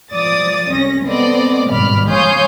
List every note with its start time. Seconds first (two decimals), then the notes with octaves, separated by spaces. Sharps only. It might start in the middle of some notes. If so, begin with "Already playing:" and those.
0.12 F3 D5 D#6 A6
0.70 C2 C#4 A#6
1.06 B3 C4 A4 D5 D#5
1.69 G#1 G2 B2 D5 B5 F6
2.09 C#5 F5 G#5 C6 D#6 G6